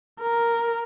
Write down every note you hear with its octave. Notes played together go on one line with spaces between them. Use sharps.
A#4